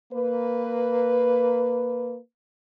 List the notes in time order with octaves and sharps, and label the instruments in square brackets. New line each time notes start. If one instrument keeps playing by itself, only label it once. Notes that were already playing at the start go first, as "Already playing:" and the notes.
[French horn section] A#3 B4